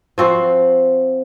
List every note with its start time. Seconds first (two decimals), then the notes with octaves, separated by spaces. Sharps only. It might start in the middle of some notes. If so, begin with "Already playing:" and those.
0.18 F3 C4 F#4